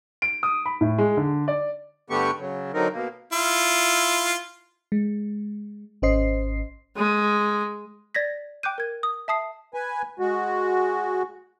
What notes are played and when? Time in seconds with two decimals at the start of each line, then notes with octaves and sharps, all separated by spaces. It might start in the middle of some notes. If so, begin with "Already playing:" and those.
0.22 D7
0.43 D#6
0.66 B5
0.81 A2
0.98 G#3
1.17 D3
1.48 D5
2.10 G2 D3 A3 B3 G4 C#6
2.40 C#3 F#3
2.74 D3 F#3 C4 D#4 A#4
2.93 B2 A#3
3.33 E4 F4
4.92 G#3
6.02 G#1 C#4 C5 D#5 C7
6.97 G#3
8.15 D5 G#6 A#6 B6
8.63 G5 D6 F#6 G6 D#7
8.78 A#4 G#6
9.03 D#6
9.28 E5 A5 D#6 C7
9.74 B4 G#5
10.19 G#3 F#4